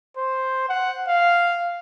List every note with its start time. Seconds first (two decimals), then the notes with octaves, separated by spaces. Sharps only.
0.17 C5
0.69 F#5
1.08 F5